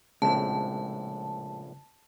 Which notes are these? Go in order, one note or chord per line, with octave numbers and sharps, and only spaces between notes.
A#1 A2 C#3 G#3 C4 A5